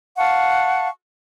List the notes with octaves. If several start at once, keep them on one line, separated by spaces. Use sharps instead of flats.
F5 F#5 A5 C#6